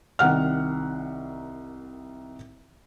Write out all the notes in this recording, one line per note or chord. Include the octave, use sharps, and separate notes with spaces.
C2 D#3 F#5 F6